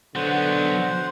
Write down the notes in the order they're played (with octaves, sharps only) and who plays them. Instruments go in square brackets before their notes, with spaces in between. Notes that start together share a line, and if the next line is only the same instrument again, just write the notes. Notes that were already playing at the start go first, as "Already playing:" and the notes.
[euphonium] D3 [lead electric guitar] F#3 B3 [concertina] C5 F#5